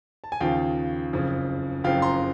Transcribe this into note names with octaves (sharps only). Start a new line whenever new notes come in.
A5
G#5
D#2 C#3 F3 F5 G5
F#1 F2 C#3
F#1 F2 C#3 F3 F5 G5
A#5 C6